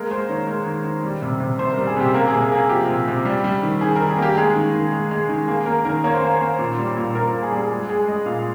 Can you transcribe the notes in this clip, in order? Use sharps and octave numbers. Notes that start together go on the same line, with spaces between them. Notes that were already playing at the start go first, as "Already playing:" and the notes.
Already playing: G#3 A#3 A#4
G#3 C5
D#3 C#5
G#3 A#4
D#3
D#3
G3
C3
C3
C3 C5
G3 A#4
G#4
C3 G4
A#3 A#4
C3 G#4
G#4
A#3 G#4
F3 G4
C3
C3
G3
G3
D#3
D#3 G#4
D#3 A#4
G#4
A#3 G4
G#3 G#4
D#3
D#3
G#3
G#3
D#3
A#3 G#4
A#3 A#4
D#3 A#4
A#3 C#5
C5
A#3 A#4
C5
A#3
A#2
G3
A#2
A#2 A#4
A#3 A#4
G#4
G3
G#4
G#3 G#4
G#3 G#4
G#3 D#5
A#2 F5